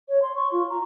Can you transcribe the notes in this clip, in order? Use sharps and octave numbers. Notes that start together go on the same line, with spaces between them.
C#5
C6
C#6
F4
A#5